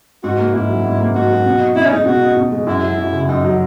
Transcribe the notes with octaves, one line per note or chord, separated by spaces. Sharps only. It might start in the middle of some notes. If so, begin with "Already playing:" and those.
G#2 F#4
A#3
G#2 E4
F#3
G#2
A#3
G#2 F#4
F#3
B2
D#4
B2 E4
C#4
G#3 D#4
B2 F#4
D#4
B2
G#3
F#2 E4
F#3
F#2
C#3
F#2 D#4
F#3